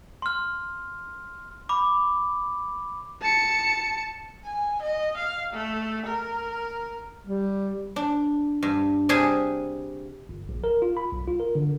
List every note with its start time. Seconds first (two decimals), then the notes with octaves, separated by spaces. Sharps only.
0.22 C6 F6
1.69 B5 D6
3.21 A5 C#7
4.45 G#5
4.82 D#5
5.17 F5
5.53 A3
6.06 A#4
7.27 G3
7.96 D4
8.63 G2
9.09 C3 G3 G#4 G#5 A5
10.29 G1
10.49 A#1
10.64 A#4
10.82 F4
10.97 B5
11.12 B1
11.27 F4
11.40 A#4
11.55 D3